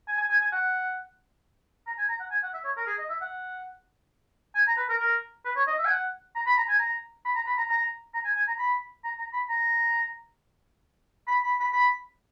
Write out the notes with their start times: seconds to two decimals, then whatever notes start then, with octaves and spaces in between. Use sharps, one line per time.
0.08 G#5
0.18 G#5
0.30 G#5
0.41 G#5
0.52 F#5
1.87 A#5
1.98 G#5
2.09 A#5
2.20 F#5
2.31 G#5
2.43 F#5
2.54 E5
2.65 C#5
2.77 A#4
2.87 G#4
2.98 D#5
3.09 E5
3.22 F#5
4.55 G#5
4.67 A#5
4.77 B4
4.89 A#4
5.00 A#4
5.45 B4
5.56 C#5
5.67 D#5
5.79 E5
5.85 G#5
5.90 F#5
6.35 A#5
6.47 B5
6.57 A#5
6.69 G#5
6.79 A#5
7.25 B5
7.35 A#5
7.47 B5
7.58 A#5
7.69 A#5
8.14 A#5
8.25 G#5
8.36 G#5
8.48 A#5
8.59 B5
9.04 A#5
9.19 A#5
9.33 B5
9.49 A#5
11.27 B5
11.44 B5
11.60 B5
11.73 B5